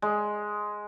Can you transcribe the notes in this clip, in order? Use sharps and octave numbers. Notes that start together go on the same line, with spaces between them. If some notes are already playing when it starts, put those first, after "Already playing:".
G#3